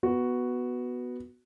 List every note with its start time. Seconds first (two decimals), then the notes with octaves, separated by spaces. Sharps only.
0.03 B3 F#4